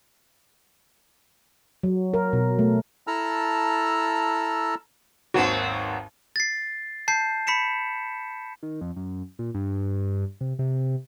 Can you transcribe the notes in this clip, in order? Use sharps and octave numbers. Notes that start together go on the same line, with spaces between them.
F#3
A#4
B2
A3
E4 A4 A5 A#5 E6 F6
G#1 D#2 F#3 B3 C4 F#4
A6 C7
A5 G6 C7
B5 B6 C#7 E7
D#3
F2
F#2
A#2
G2
C3
C3